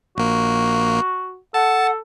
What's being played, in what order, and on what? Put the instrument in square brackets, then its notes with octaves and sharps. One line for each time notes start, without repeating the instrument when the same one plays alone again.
[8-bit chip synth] A#1 A#3 [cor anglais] F#4
[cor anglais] A4 [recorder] F#5 [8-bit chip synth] A5